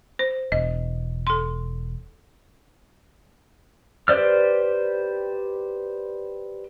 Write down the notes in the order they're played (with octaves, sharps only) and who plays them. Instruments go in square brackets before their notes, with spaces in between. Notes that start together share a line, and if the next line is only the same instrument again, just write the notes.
[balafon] C5
[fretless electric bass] E1 [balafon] D#5
[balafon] A4 C6
[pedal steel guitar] G4 B4 C5 D5 F6